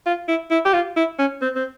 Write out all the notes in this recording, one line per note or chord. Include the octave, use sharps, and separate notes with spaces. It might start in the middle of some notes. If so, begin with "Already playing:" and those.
F4
E4
E4
G4
F4
E4
C#4
C4
C4